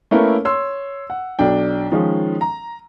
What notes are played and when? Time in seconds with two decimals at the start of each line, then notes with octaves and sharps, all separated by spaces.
0.11 A3 A#3 C#4 E4 A#4 B4
0.45 C#5 C6 E6
1.10 F#5
1.39 B1 F#3 D4 G5
1.91 D#3 F3 G#3 C#4
2.41 A#5